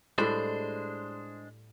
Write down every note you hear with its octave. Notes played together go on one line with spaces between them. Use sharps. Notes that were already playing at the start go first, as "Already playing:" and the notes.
A2 G3 G#3 D4 C5